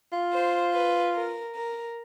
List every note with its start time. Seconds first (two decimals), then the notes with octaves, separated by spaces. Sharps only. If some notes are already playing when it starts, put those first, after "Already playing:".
0.13 F4
0.33 C5
0.74 B4
1.14 A#4
1.55 A#4